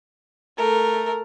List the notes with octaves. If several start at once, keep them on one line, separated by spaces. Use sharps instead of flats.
A3 A#4